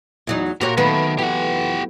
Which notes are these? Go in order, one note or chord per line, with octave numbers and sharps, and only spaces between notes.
E2 F#3 D#4
A#2 F#4 G4 A#4 C#5
D#3 F#3 A3 B3 B4
E3 G4 F#5